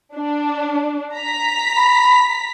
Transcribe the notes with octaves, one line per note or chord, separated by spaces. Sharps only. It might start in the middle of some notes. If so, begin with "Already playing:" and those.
D4
A#5 B6
B5